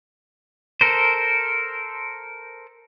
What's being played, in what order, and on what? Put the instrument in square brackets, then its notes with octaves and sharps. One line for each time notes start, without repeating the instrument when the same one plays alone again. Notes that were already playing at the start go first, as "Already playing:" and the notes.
[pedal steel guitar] A4 A#4 C5